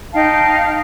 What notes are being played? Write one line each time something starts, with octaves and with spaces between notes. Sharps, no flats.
D#4 F5 G5 A5